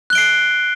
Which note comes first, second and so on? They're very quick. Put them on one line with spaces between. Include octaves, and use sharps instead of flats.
F#6 G7 D7 C7